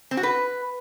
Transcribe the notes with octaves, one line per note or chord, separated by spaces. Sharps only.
C4
F#4
B4